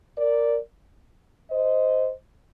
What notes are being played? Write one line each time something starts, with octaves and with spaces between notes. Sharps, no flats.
A#4 D5
C5 D#5